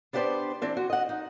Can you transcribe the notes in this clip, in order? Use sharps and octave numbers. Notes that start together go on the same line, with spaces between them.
B3 D4 G4 B4 C5 D5
E3 C4 D4
F#4
D#5 F#5
D#4